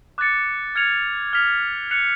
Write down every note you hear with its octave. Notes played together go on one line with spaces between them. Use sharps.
D6 F#6 A6 C#7
F6 G#6 C#7 F7
F6 B6 F7
F#6 C#7 F7